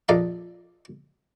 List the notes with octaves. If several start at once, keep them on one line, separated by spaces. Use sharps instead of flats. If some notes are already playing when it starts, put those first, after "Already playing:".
A#1 A4 D5 D#5 F5 A#5